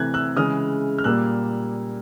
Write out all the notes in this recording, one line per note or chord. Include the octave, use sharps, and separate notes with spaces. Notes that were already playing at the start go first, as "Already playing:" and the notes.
Already playing: C3 E3 A3 F#6 G#6
E6 F#6
C#3 E3 G#3 D#6 F6
F6
A#2 G3 A#3 E6 F#6